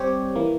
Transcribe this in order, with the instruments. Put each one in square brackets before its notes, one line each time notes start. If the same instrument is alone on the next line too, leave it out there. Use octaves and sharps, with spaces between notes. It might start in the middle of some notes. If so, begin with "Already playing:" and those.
Already playing: [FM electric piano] G3 C4 G4 C#5
E3 A#3